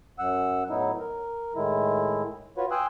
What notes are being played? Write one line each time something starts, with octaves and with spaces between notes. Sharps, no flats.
F#2 F#5 E6
A2 F#3 B3 D#4 E4
A#4
A2 D#3 G#3 E4
F4 F#4 B4 C#5
G5 G#5 C6 D#6 E6 F#6